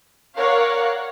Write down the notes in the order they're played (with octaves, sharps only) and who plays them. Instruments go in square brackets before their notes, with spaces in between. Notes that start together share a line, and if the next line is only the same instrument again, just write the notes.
[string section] A#4 C#5 D5 F5 F#5